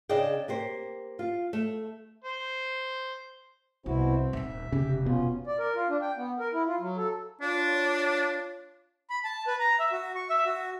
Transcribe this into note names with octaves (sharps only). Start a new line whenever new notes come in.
C#3 D4 G#4 D5 D#5 G5
A#3 G4 C5
F4
A3
C5
C2 B2 C4 E4 F#4
D#1 D#2 E5
F1 C#3 G4
B2 B3 C#4 F4
D5
A#4
F4
D4
G5
B3
A#4
E4
F4
F#3
A4
D4 F4 C#5
B5
A5
B4
A#5
E5
F#4
C#6
E5
F#4